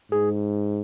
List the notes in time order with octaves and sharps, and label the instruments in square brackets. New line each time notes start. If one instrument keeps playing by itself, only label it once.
[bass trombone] G#2 [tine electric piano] G#4